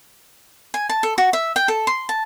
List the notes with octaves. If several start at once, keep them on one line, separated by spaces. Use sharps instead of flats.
G#5
A5
A4
F#4
E5
G5
A4
C6
A5